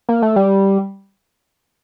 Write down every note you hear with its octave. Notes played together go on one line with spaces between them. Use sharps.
A#3
A3
G3